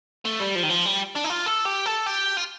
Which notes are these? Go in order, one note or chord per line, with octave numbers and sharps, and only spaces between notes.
A3
G3
F3
D#3
F3
G3
D4
D#4
F4
A4
G4
A4
G4
F4